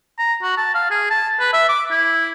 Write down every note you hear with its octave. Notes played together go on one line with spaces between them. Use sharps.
A#5
F#4
A5
F5
G#4
A5
B4
E5
D6
E4